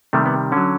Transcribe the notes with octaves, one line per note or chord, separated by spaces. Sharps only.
C3 D#3 G3 A3
B3
D3 F#3 C#4